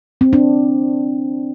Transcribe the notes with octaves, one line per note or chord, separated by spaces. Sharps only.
C4
D4